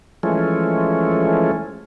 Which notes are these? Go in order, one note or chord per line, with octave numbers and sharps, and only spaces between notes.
E3 F3 G#3 A3 C#4